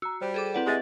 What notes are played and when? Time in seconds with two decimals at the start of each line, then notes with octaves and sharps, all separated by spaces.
0.02 F#4 A#5 E6
0.21 G3 C5
0.34 G#4 A4 D6
0.54 C4 E4 B4 D5 F#5
0.67 G#3 G4 D#5 E5